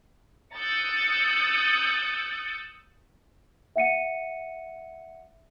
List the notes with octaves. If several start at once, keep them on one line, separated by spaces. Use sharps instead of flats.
D#6 E6 F#6 G6 A6 C#7
E5 F#5 C#7 D#7